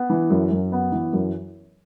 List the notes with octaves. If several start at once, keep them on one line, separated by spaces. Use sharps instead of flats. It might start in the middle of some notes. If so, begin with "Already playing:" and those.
Already playing: B3
E3
F#2
F#2
B3
E3
F#2